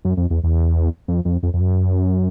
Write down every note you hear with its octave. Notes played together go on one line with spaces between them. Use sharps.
F#2
F2
E2
E2
F2
F2
F2
F2
F#2